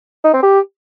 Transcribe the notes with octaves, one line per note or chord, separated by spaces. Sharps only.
D#4
C4
G4